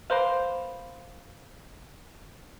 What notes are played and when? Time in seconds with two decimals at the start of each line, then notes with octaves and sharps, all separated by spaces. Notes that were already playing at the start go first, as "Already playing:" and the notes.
0.10 A#3 B4 C5 F5